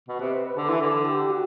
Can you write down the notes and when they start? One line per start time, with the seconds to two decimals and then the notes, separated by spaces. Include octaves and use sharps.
0.08 B2
0.19 C3 B4
0.57 D3 A4
0.69 E3
0.81 D3 A4
1.05 G4
1.30 F#4